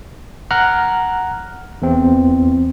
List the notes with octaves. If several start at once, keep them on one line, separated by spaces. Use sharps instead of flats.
F#5 A#5 F6 F#6
E2 C4